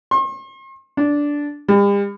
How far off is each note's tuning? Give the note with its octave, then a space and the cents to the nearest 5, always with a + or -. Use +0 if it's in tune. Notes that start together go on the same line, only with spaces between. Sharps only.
C6 +45
D4 -10
G3 +45